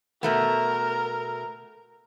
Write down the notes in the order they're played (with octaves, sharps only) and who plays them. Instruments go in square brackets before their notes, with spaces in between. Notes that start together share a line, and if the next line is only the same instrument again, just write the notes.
[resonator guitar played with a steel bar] B2 A3 B3 [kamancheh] A#4